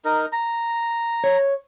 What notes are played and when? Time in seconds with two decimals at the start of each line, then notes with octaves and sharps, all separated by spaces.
0.05 D#4 A#4
0.32 A#5
1.24 C#5